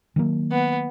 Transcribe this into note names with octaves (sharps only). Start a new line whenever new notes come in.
D#3 F#3 A#3
B3